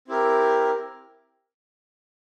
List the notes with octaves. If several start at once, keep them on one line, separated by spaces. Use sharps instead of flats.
C4 E4 G4 A#4